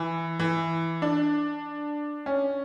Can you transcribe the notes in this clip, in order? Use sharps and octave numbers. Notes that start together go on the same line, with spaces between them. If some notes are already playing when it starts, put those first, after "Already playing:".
Already playing: E3
E3
D4
C#4